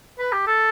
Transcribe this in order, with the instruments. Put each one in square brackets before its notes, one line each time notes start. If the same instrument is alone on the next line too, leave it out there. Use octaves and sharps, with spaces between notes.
[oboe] B4
G4
A4